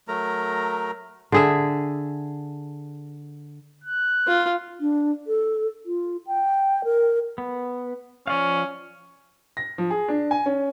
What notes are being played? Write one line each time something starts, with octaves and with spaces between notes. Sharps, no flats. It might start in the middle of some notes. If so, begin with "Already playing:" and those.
F#3 A3 A#4 A#5
D3 G#4 E5
F#6
F4
D4
A4
F4
G5
A#4
B3
F3 C#4 D5 F5
A#6
F3
G#4
D4
G#5
C#4